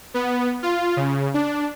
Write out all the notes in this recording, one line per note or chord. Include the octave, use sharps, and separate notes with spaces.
B3
F4
C#3
D4